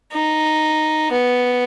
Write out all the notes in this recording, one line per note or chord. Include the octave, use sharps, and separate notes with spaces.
D#4
B3